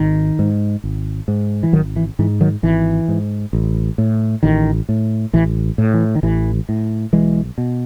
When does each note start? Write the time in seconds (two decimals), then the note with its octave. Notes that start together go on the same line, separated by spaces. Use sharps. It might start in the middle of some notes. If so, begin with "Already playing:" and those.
Already playing: G#1 D#3
0.39 G#2
0.84 G#1
1.28 G#2
1.63 E3
1.73 G#1 D#3 F#3
1.96 E3
2.19 G#2 E3
2.41 D#3 F#3
2.63 G#1 E3
3.08 G#2
3.53 A1
3.98 A2
4.43 A1 D#3
4.89 A2
5.33 A1 E3
5.78 A2
5.94 E3
6.15 D#3
6.23 A1 E3
6.69 A2
7.13 B1 E3 G#3
7.58 B2